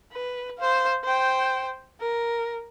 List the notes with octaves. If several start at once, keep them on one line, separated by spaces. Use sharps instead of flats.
B4
C5 F5
C5 G5
A#4